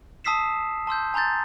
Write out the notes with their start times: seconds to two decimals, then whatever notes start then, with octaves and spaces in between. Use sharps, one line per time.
0.24 A5 D#6 E6 B6 C7 E7
0.87 A5 C6 E6 G6
1.14 G#5 A#5 C6 G6 A6